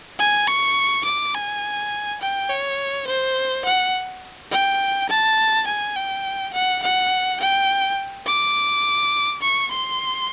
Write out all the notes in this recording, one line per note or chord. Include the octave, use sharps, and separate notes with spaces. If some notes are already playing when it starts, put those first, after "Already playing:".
G#5
C#6
D6
G#5
G5
C#5
C5
F#5
G5
A5
G#5
G5
F#5
F#5
G5
D6
C#6
C6